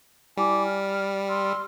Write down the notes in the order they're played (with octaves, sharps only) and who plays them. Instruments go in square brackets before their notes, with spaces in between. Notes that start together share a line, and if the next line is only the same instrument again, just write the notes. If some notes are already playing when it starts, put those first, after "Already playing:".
[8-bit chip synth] G3 [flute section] E4 G#5 D6
[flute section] F6
C6 E6 F6